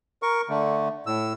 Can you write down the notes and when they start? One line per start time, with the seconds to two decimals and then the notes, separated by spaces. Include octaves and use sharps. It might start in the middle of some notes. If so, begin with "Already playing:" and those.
0.22 A#4 C#6
0.49 D3 A3
1.06 A2 E6